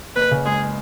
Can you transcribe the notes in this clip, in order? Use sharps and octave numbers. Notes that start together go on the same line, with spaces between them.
F#1 B4
C#3
G#3 G#4